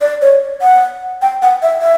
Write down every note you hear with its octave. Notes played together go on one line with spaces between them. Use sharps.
D5
C#5
F#5
G5
F#5
E5
E5